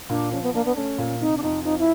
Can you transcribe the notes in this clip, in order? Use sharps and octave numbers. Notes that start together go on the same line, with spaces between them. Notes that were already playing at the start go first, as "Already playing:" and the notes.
A#2 D4
F3 C#4
B3
A#3 D4
B3
A3 C#4
A#2
C3 D#4
D4
F2 D#4
F3 D#4
E4